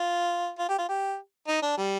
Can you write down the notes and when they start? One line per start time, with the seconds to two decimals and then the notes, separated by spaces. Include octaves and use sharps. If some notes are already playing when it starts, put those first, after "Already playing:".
Already playing: F4
0.58 F4
0.69 G4
0.78 F4
0.88 G4
1.48 D#4
1.62 D4
1.77 G3